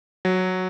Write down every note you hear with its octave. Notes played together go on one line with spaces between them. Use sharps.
F#3